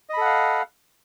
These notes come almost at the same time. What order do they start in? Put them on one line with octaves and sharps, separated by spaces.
D#5 B5 A4 F#5 F5